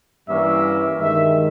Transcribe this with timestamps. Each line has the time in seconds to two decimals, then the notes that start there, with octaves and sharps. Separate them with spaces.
0.29 G2 E3 G3 A#3 C#4 E5
0.99 G2 D#3 G#3 E5